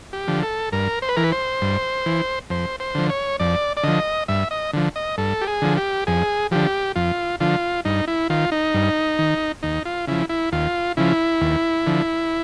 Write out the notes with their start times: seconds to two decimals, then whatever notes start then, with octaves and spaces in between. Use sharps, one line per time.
0.13 G4
0.27 D3 F3
0.43 A4
0.72 G2 A#4
1.02 C5
1.09 B4
1.16 E3 A#4
1.24 B4
1.32 C5
1.62 G2
2.06 E3
2.50 F2 C5
2.80 C5
2.95 D3 F3
3.10 C#5
3.40 F2 D5
3.77 D5
3.84 D3 F3 D#5
4.28 G2 E5
4.51 D#5
4.73 D3 F3
4.96 D#5
5.18 G2 A4
5.41 G4
5.47 G#4
5.62 D3 F3
5.77 G4
6.07 F2 G#4
6.51 D3 F3 G4
6.96 F2 F4
7.40 D3 F3 F4
7.85 G2 D#4
8.07 E4
8.30 D#3 F4
8.52 D#4
8.74 G2
9.19 D#3
9.63 D#2 D#4
9.85 F4
10.07 C#3 F3 E4
10.29 E4
10.52 D#2 F4
10.97 C#3 F3 E4
11.41 D#2
11.87 D3 F3